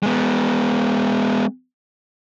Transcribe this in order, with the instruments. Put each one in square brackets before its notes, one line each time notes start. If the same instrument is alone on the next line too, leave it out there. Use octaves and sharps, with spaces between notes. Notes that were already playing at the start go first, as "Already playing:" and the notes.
[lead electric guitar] G#3 B3